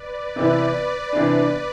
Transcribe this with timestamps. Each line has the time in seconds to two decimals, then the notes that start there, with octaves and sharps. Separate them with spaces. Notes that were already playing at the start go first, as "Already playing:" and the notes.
Already playing: B4 D5
0.36 C3 E3 B3 E4 B4 D5
0.74 B4 D5
1.12 C3 E3 B3 D4 B4 D5